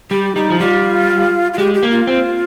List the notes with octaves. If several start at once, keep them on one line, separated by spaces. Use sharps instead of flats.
G3 G4
G3 D#4
F3
G3 F4
F4
G#3 G4
G4
A#3
F4
C4